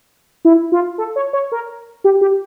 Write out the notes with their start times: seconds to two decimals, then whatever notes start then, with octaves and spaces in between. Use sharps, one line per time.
0.45 E4
0.72 F4
0.98 A4
1.16 C#5
1.33 C#5
1.52 A#4
2.04 G4
2.21 G4